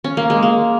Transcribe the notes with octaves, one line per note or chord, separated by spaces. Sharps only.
C#4
A#3
G#3
A#3